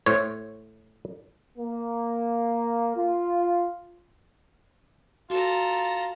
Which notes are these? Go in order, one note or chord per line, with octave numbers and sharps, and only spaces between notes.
A2 C5 C#5
A#3
F4
F4 F#4 A4 A#5